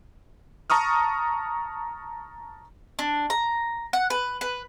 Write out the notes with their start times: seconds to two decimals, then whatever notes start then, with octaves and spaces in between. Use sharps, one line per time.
0.70 A5 A#5 C#6 D#6 F6
2.99 D4
3.30 A#5
3.93 F#5
4.10 B4
4.41 B4